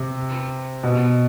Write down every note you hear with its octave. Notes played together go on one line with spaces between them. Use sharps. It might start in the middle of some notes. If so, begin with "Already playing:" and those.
Already playing: C3
B2